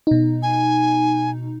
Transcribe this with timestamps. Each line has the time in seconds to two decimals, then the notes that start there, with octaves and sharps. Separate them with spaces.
0.07 B2 D#4
0.43 G#5